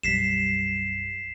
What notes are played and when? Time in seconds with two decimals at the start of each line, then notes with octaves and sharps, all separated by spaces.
0.03 B1 F#2 G3 B6 C7 E7